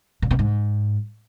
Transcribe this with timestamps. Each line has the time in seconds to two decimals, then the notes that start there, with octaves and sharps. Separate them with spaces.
0.22 A#2
0.31 B2
0.39 G#2